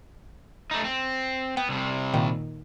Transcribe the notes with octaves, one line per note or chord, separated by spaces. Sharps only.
A3 D#4
C4
B3 G5
C2 C3
A#2 D#3